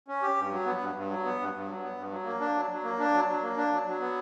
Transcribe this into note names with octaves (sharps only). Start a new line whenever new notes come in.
C#4
G4
G2
F#3
B3
G2
G2
F#3
B3
G2
G2
F#3
B3
G2
F#3
A#3
D4
F#3
F#3
A#3
D4
F#3
F#3
A#3
D4
F#3
F#3
B3